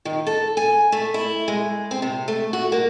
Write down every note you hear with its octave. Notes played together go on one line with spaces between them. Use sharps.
D#3
A4
G#5
A3
E4
G#3
C4
C3
A3
F#4
A#3